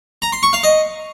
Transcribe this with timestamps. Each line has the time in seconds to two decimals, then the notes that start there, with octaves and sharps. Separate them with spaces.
0.22 A#5
0.32 C6
0.43 C#6
0.53 F5
0.63 D#5